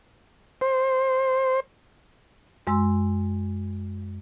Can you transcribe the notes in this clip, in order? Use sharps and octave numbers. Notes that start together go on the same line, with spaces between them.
C5
F#2 G#3 C6 E6